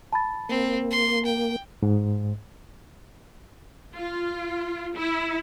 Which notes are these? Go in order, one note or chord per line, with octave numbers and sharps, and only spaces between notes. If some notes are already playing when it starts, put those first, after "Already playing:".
A5 B5 A6
A#3 C4
C6
G5
G#2
F4
E4